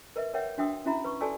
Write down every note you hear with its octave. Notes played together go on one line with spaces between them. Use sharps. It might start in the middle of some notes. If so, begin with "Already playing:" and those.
A#4 B4 D#5 E5
A#4 C#5 E5 F#5 G5
D4 F#4 E5 G5 D#6 E6
C#4 E4 F#4 E5 A#5 B5
B4 C#6
F#4 A4 D5 G#5 A5 E6